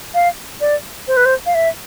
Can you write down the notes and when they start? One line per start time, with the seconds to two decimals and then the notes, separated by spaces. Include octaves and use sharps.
0.14 F5
0.61 D5
1.08 C5
1.17 B4
1.25 C5
1.46 F5
1.55 E5